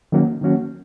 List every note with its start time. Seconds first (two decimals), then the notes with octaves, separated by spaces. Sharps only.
0.12 D#3 F#3 A#3 C#4 F#4
0.41 D#3 F#3 A#3 C#4 F#4